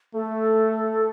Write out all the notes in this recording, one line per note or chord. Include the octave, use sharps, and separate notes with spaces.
A3 A4